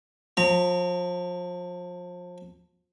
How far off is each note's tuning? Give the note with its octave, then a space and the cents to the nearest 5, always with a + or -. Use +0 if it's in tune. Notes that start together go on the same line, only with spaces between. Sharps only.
F3 +30 A#5 -25